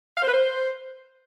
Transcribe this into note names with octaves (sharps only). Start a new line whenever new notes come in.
F5
C5
B4
C5